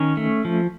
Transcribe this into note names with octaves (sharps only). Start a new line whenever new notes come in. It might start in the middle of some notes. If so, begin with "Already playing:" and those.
Already playing: D#3 C#4 C#5
A3
F3